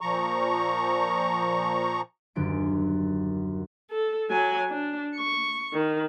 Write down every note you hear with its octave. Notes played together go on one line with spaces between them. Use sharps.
A#2 F3 A#5 C#6
D#1 F#2 D3 D7
A4
F#3 G#5
D4
C#6
D#3